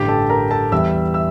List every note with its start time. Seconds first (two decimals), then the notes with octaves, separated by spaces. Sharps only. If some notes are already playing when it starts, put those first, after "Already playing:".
Already playing: A1 G2 D3 G4 G5
0.08 A4 A5
0.30 A#4 A#5
0.51 A4 A5
0.72 E2 E3 G3 E5 E6
1.14 E5 E6